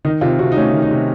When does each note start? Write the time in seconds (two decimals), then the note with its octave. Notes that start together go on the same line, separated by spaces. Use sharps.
0.05 D#3 D#4
0.21 C3 F4
0.39 C3 F#4
0.52 D#4
0.57 A3 C#4
0.74 D#3
0.82 D#4
0.91 C3